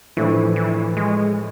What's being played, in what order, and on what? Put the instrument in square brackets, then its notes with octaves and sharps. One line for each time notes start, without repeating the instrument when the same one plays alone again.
[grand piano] A2 F3 A3 D4 [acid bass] E3
[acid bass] E3
G#3